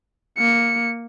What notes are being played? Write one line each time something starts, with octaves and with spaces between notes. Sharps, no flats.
A#3 C#7